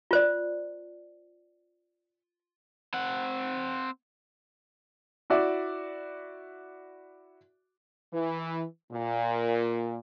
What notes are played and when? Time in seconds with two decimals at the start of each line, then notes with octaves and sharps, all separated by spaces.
0.11 F4 C5 D5
2.94 C4 F#5
5.30 E4 F#4 D5 E5
8.14 E3
8.92 A#2